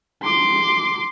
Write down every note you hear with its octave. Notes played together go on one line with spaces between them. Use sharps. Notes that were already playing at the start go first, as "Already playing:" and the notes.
C6 D6